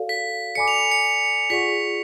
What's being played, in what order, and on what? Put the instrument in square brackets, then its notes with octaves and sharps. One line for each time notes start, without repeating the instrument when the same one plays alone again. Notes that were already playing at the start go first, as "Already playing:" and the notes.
Already playing: [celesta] F#4 A4 D5 F5
[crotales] B6
[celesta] A4 D5 G#5 B5 D6 [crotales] C#7
[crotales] F7
C#7
[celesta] F4 G#4 D5 F#5 C#6 [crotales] B6